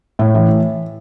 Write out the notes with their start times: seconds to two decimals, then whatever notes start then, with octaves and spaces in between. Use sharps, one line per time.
0.19 A2 E5
0.35 E3